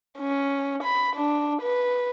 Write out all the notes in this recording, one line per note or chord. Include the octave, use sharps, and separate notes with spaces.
C#4
B5
D4
B4